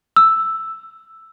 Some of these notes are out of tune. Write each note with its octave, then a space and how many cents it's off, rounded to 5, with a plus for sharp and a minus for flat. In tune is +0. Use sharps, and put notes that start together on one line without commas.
E6 +0